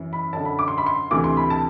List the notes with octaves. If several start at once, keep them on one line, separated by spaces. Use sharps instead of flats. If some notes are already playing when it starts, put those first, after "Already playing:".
Already playing: F#2 E3
B5
F#2 D3 A5
B5
D6
C6
B5
C6
D2 C3 E3 D6
C6
B5
A5